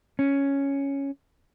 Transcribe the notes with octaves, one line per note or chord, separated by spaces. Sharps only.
C#4